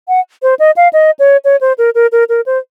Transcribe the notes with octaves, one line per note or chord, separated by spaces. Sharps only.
F#5
C5
D#5
F5
D#5
C#5
C#5
C5
A#4
A#4
A#4
A#4
C5